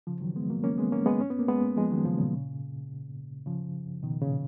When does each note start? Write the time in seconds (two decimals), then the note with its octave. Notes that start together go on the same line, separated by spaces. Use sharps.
0.07 C#3 F3
0.21 D#3 F#3
0.36 G#3 B3
0.50 F#3 A#3
0.63 A#3 C#4
0.78 G#3 B3
0.92 A#3 C#4
1.06 G#3 B3
1.21 C#4
1.30 B3
1.39 A#3
1.48 G#3 B3
1.77 F3 G#3
1.91 D#3 F#3
2.05 C#3 F3
2.19 A#2 C#3
3.46 C#3 F3
4.03 B2 D#3
4.22 A#2 C#3